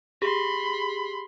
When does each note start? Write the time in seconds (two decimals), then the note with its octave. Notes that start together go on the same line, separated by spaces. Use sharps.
0.22 G4 G#4 B5 C6